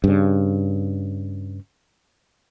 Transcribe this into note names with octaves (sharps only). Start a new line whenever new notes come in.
G2 C#3